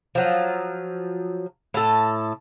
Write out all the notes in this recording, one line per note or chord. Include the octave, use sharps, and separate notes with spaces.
F3 F#3
A2 A4